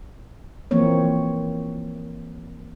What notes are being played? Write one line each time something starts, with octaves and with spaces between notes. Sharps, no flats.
E3 F3 A#3 C4 C#5